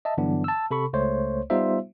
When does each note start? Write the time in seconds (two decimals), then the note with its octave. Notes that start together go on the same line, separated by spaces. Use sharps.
0.05 D#5 E5 A5
0.17 G2 D3 E3 F#3 B3 D4
0.44 A5 E6
0.71 C3 A4 B5 C#6
0.93 C#2 A3 C5 C#5
1.50 G3 B3 D#4 F4 C5 E5